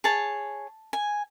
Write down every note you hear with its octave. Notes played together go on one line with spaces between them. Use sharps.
G#4 C#5 A5
G#5